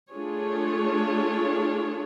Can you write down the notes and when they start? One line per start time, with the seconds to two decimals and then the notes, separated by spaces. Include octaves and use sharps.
0.11 A3 D4 F4 G#4 C#5